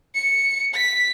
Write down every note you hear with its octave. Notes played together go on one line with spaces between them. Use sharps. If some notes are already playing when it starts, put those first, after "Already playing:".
C#7
B6